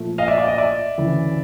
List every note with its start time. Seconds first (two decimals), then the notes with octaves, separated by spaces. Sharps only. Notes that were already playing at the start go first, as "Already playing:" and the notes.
Already playing: A#2 F3 A3
0.18 D#5 F5
0.28 D5 E5
0.38 D5
0.48 D#5
0.58 D5 E5
0.98 D2 C#3 E3